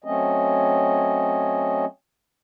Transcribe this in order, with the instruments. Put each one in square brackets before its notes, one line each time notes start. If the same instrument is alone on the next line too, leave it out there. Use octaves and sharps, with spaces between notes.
[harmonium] F#3 A3 C4 C#4 D#5